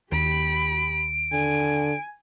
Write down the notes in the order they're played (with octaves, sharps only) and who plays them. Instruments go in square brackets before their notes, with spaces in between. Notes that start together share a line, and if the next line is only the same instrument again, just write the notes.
[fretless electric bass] D#2 [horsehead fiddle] G4 B5 [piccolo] D7
[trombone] D3 [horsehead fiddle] G#5